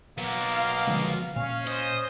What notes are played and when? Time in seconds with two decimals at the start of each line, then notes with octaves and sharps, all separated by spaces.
0.18 F#3 A#3 B3
0.52 F5
0.87 D3 F3 G#3
1.36 A#2 C#4 F5
1.67 C5 D#5